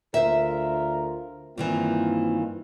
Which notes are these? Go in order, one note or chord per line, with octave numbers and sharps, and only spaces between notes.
D2 F4 A#4 C5 E5
G2 D#3 E3 A#3 C4 F4